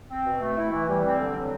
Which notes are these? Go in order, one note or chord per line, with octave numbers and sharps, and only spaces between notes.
C4
B2
A3
E4
E3
G3
C4
D3
F#3